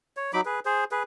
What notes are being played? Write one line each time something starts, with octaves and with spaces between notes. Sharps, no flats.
C#5
F#3 D#4 B5 D6
G#4 B4
G#4 C5
G#4 B4